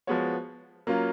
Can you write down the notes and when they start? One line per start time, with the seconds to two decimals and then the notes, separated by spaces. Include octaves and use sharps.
0.07 F3 G#3 B3 F#4 C#5
0.87 F#3 A#3 C#4 F4